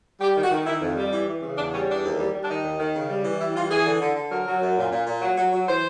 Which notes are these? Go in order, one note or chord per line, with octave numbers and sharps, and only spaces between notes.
G3 G4
D#3
F#4
D#3
D#3 E4
F2
G3
E3
E3
C#3
E2 D4
G3 C#4
E2 D4
D#2
G3
G3
D4
D#3 D#4
D#2
D#3
C#3
G3
E3
G3 E4
E3 F4
E3 G#4
D3
D3
D3
F#3 A#4
F#3
F#2
A#2
A#2
A#2
F#3
F#3
F#3
E3 C5